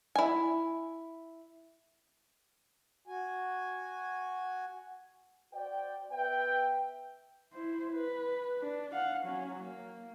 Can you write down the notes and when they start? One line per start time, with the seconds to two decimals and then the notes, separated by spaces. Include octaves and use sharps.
0.15 E4 G#5
3.07 F#4 G#5
5.53 F#4 C5 D5 G5
6.12 B3 B4 E5 G5
7.53 E4 C5
7.93 B4
8.62 D4
8.92 F5 F#5
9.24 F#3 C#4
9.61 A#3